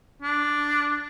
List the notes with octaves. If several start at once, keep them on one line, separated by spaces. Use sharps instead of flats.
D4